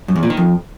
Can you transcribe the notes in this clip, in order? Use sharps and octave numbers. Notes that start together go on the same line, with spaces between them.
F#2
E2
A#2
D#3
F2